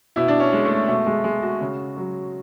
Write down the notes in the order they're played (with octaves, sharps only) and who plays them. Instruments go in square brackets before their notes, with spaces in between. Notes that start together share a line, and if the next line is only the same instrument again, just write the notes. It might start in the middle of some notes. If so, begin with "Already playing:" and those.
[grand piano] B2 E4
D4
C#4
G#3
A3
B2 A3
G#3
G#3
F#4
C#3
F#3